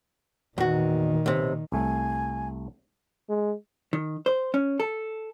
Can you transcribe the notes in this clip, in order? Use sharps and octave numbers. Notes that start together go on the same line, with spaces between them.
E2 A#2 D#3 F#4
B1 C3
C2 A3 G#5
G#3
D#3
C5
C#4
A4